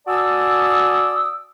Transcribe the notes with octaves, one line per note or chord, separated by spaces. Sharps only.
F#4 D5 G#5 A5 D#6 E6